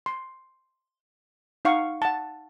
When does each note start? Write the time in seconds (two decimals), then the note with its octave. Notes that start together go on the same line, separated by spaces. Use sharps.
0.06 C6
1.65 D#4 F5 F#5 C#6
2.02 F#5 A5